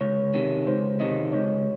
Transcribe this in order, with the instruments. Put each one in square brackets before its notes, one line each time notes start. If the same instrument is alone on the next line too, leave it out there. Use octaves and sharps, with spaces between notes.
[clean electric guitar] C#2 [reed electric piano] C#5
[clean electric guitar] C3 D#3
[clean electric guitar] C#2 [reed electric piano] C5
[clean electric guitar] C3 D#3 [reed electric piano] D#5
[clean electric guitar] C#2 [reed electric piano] C#5